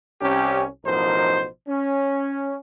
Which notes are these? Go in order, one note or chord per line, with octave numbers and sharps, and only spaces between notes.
C2 C#4 G4
A1 B2 F3 D#4 A#4 C5
C#4